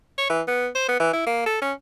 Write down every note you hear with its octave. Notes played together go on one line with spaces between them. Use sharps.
C#5
E3
B3
C5
B3
E3
E4
A#3
A4
C#4